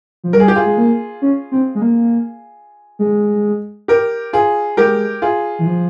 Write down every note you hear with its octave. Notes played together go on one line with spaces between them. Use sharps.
F3
G3 A#4
G#4
G4
F4 G#4
G#3
A#3
C#4
C4
G#3
A#3
G#3
G4 A#4
F4 G#4
G#3 G4 A#4
F4 G#4
E3
F3